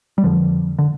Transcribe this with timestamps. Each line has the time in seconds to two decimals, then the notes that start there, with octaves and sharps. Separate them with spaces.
0.18 G3
0.24 F2 D3 F3
0.79 D3